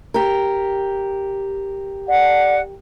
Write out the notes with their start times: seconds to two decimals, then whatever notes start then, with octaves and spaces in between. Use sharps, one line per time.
0.14 G4 A#4
2.09 D5 F#5